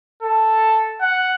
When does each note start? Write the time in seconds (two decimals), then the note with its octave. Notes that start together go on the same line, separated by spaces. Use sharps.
0.23 A4
1.01 F#5